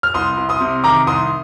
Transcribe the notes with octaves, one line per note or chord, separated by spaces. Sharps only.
F6
C2 C6 D#6
C2
C6 D#6
C3
D#3 A#5 D6
C2 C6 D#6